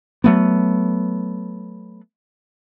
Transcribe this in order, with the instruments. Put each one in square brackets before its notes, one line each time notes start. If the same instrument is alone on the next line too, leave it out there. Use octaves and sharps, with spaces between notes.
[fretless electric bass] F#3 A3 B3